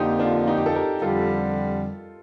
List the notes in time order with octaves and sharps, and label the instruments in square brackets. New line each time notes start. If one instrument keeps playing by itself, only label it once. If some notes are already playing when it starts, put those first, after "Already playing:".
Already playing: [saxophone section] F2 D3 F3 A#3 [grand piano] D#4 G4
[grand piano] D4 F4
D#4 G4
G4
A4
G4 A#4
[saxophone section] F2 D3 G3 [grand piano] F4 A4